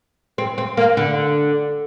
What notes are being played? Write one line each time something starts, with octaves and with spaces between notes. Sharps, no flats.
C4
C4
A#3
D3